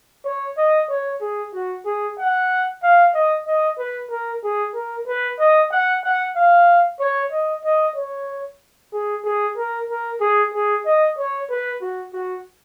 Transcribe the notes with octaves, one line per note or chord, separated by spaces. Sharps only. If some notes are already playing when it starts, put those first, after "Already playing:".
C#5
D#5
C#5
G#4
F#4
G#4
F#5
F5
D#5
D#5
B4
A#4
G#4
A#4
B4
D#5
F#5
F#5
F5
C#5
D#5
D#5
C#5
G#4
G#4
A#4
A#4
G#4
G#4
D#5
C#5
B4
F#4
F#4